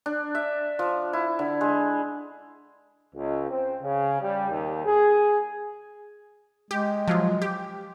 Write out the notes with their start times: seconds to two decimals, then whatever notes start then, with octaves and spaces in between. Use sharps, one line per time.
0.06 D4
0.35 E5
0.79 F3
1.13 E4
1.39 D3
1.61 G#3
3.15 C#2
3.50 C4
3.82 C#3
4.22 G3
4.50 D#2
4.85 G#4
6.71 G#3 G4
7.08 F3 F#3 F4
7.42 G4